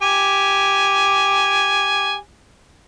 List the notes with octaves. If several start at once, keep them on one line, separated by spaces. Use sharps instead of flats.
G4 G#5